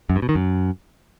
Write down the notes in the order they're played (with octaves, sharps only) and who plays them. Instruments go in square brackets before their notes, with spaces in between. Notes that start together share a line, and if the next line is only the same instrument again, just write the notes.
[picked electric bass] F#2
G2
B2
D#3
F#2